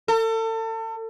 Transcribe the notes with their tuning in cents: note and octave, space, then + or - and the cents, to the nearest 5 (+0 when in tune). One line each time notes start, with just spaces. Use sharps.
A4 +35